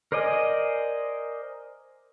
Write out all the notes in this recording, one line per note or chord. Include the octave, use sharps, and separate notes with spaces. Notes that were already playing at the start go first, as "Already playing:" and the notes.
A#4 C5 D5 D#5 G#5